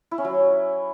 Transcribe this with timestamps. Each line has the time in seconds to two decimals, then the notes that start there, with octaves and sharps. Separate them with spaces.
0.11 E4
0.18 C#4
0.24 F#3